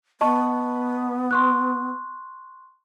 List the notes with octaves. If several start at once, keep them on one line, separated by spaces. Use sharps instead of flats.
B3 D#5 A5 C#6
C6 C#6 F#6